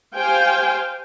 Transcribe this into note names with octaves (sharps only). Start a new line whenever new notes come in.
G4 C5 F5 G5 G#5